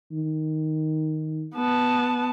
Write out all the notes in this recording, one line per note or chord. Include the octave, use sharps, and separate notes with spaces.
D#3
B3 A5